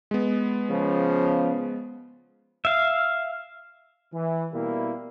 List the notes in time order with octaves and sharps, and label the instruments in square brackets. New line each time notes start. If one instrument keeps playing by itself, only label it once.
[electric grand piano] G#3 B3
[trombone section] C#3 F3
[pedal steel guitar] E5 F5
[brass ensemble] E3
B2 G3 A#3 E4